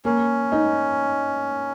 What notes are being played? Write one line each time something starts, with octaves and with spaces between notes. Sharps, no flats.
A#3 C#4
D#4